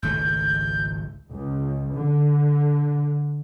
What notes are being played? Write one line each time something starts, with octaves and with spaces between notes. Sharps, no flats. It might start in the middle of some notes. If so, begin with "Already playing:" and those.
G#1 C#2 A3 G6
C#2
D3